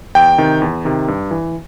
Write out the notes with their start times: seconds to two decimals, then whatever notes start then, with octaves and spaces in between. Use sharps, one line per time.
0.15 E2 G5
0.38 C3 D#3
0.62 E2
0.85 C3 D#3
1.08 G2
1.31 E3